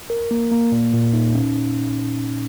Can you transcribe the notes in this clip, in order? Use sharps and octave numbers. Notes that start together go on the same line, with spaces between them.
A#4
A#3
A#3
A#2
A#2
D#4
C#4